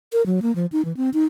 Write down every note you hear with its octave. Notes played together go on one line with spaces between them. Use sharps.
A#4
F#3
A#3
F3
D#4
E3
C4
D#4